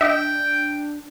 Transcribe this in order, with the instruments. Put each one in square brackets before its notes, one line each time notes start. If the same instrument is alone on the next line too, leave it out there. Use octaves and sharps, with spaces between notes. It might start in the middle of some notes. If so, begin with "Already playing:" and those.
[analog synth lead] D4 [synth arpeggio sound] D#5 E5 [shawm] G5